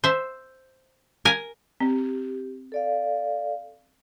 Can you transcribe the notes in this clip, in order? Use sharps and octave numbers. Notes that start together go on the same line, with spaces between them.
C5 E5
A#4 G#5
C4 G4
A4 D5 F5